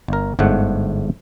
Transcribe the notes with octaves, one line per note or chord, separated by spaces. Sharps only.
G1 A#4
G1 G#2 A3 F#5